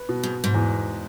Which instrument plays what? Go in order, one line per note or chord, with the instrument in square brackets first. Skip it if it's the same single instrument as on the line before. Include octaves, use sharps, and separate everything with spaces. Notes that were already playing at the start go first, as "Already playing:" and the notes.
Already playing: [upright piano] B4
B2
[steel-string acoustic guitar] G#2
G#2
[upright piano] E2